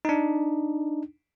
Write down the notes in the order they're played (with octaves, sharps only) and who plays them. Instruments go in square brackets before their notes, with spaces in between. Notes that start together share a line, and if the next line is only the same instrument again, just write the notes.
[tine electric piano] D4 D#4